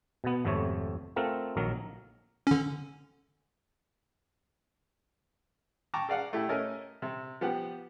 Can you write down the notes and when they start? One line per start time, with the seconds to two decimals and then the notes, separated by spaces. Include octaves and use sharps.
0.24 B2 B3
0.45 G#1 F2 C3 A3 C#5
1.16 A3 C4 F4 A#4 F#5
1.57 A#1 D#3 F#3 A#4
2.47 D3 C#4
5.94 G5 A5 A#5 C#6 D6
6.09 G#4 D5 F5 F#5
6.33 A3 E4 G4
6.49 A3 C#4 A#4 D#5
7.02 C3
7.41 F3 B3 G4 F#5